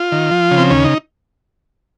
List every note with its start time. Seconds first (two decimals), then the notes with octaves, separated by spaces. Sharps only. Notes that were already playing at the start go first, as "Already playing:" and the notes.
Already playing: F4
0.12 D#3
0.31 F3
0.51 C#3
0.58 C4
0.70 D#2 C#4
0.84 D#4